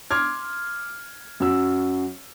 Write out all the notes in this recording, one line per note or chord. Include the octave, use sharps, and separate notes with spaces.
C6 D6 F6 G#6
F#2 F#4 E6